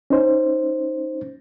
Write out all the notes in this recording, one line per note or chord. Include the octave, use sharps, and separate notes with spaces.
C#4 D#4 C5